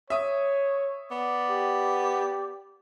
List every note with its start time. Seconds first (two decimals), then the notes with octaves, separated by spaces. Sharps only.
0.10 C#5 E5 D#6
1.11 B3 D5
1.50 G4